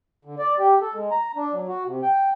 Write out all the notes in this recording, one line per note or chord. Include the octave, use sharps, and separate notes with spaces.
D3
D5
G4
A4
G#3
A#5
D4
F#3
F#4
C3
G5